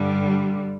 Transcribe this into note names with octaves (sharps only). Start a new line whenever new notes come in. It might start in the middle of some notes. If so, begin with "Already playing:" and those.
Already playing: G2 D3 G3